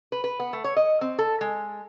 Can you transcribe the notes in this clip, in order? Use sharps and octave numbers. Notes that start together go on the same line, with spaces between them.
B4
B4
B3
A3
C#5
D#5
C4
A4
G#3